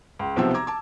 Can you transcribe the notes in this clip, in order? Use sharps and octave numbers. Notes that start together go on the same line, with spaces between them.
C#2
B1 C3 F3 B3 C4 E6
A#5 D6 G#6
A5 D6